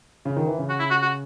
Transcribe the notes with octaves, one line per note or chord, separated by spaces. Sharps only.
C#3
D#3
E3
C#3
F#4
E4
F#4
F#4